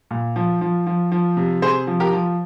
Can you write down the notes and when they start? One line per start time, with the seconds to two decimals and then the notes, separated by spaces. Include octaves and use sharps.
0.11 A#2
0.36 F3
0.61 F3
0.86 F3
1.12 F3
1.37 C3
1.62 C3 G#4 C5
1.87 F3
2.00 G4 A#4
2.13 F3